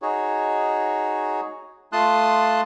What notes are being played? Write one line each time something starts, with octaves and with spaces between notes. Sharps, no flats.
D#4 F#4 G#4 C#5
A3 F4 A5 C6 D#6 F#6